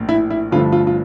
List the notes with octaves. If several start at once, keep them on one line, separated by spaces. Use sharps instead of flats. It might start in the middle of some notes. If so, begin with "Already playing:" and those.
Already playing: A#1 A2
E4
E4
G1 G2 D3 F3 A3 F4
F4
F4